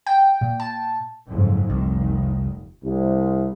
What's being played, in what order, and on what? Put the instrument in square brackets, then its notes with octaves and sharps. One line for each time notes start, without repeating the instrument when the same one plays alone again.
[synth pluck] G5
A#2
A5
[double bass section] F#1 F2 G#2
[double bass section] F1 D#3 [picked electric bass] C2
[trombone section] C2